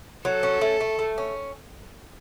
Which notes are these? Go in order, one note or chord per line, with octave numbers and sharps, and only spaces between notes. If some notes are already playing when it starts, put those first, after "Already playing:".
F#3 A4
C#4
A3
A3
A3
C#4